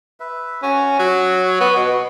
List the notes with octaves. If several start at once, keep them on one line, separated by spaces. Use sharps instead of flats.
B4 E5
C#4 F#4
F#3
B3
B2